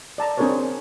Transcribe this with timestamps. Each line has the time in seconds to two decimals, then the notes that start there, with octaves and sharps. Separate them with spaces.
0.18 D5 A5 A#5
0.38 C4 D4 G#4 A#4 C5 C#5